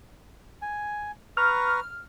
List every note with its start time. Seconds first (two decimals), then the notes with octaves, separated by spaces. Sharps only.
0.62 G#5
1.37 B4 A#5 C#6 F6